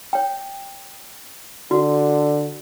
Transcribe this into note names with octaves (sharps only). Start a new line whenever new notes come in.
C#5 G5
D3 F#4